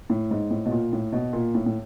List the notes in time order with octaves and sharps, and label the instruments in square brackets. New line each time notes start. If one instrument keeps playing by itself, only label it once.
[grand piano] A2
G#2
A2
B2
A#2
A2
B2
A#2
A2
A2